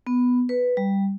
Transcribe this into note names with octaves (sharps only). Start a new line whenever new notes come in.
B3
B4
G3